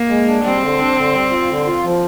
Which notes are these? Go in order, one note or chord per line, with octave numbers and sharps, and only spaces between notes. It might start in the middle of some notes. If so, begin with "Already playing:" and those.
Already playing: A#3
G#3
D4
G3 C4
D3
D4
D3
G3
F4
D3
F4
F3